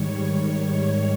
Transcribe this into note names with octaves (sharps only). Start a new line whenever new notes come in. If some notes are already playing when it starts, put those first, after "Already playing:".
Already playing: G#2 D#3 G3 C#5